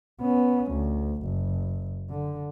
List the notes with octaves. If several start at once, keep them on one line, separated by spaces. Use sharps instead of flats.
B3 C#4
D2
F#1
D3